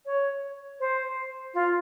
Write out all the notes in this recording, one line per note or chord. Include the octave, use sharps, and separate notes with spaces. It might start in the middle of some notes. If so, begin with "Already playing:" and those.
C#5
C5
F4